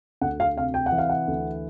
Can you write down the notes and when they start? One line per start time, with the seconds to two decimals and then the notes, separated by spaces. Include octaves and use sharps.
0.21 D2 F#5
0.40 F5
0.56 C3 F5
0.74 G5
0.86 F#5
0.92 E3
0.98 F5
1.09 F#5
1.28 D2